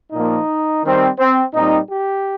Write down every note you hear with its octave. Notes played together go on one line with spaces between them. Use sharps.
A#2 F3 A#3 D#4
D#3 G3 C4
C4
A#2 G3 C4 D#4
G4